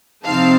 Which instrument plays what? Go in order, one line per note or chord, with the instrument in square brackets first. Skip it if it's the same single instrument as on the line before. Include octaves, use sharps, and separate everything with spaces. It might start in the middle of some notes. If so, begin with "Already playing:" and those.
[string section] C3 F3 C4 D#4 F5 A5